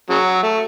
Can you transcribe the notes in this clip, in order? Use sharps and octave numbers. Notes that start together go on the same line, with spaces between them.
C#3 F#3
A3